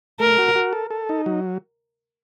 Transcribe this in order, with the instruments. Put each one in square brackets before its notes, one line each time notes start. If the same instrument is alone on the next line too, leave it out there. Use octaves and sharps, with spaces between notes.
[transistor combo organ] A3 [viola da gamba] A#4
[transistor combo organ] F#4
F#4
A4
A4
D#4
F#3